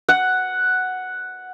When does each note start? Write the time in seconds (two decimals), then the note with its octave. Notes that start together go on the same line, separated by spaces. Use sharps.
0.09 F#5